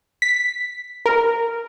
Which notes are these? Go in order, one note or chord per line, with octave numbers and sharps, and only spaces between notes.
B6
A#4